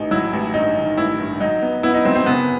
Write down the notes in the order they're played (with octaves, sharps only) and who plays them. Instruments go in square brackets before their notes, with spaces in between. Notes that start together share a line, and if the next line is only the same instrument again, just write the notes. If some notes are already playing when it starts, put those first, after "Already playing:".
Already playing: [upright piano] A1 D#3 [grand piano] D#4
[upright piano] F#3 [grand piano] E4
[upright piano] A1
[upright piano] G2 [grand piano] D#4
[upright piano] D#3
[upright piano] A1 [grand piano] E4
[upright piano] G2
[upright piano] F#3 [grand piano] D#4
[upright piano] B3
[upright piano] B3 [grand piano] E4
[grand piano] D#4
[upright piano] F#3 [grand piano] C4
[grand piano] C4
[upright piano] F#1 [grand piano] B3